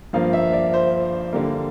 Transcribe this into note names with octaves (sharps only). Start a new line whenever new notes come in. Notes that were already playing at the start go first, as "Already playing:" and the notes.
G2 F3 A#3 F5
E5
D5
C5
D3 G3 A#3